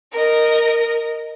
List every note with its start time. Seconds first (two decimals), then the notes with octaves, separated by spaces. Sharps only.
0.12 A#4 D#5